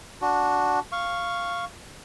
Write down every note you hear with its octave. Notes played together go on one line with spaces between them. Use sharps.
D4 F#4
F5 C#6